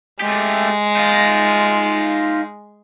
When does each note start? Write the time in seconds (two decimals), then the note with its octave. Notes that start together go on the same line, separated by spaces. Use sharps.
0.20 G#3 A3 G4
0.96 D#4 F4